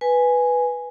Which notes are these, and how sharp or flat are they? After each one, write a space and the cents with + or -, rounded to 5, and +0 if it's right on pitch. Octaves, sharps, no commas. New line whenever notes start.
B4 +0 G#5 +0